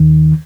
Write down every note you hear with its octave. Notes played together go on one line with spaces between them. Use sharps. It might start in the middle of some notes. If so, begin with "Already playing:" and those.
Already playing: D#2 D#3